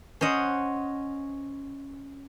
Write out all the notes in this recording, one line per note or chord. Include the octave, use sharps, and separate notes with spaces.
C#4 C5 D#5 F#5